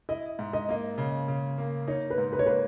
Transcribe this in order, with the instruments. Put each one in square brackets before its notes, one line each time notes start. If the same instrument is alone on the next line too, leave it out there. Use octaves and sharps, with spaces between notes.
[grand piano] E4 [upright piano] D#5
[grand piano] G#2
[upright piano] D#5
[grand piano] A#3 [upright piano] D#5
[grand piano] C#3
C#3
A#3
[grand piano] D#4 [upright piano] C#5
[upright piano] B4
[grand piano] G#2
[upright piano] B4
C#5
[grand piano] A#3 [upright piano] B4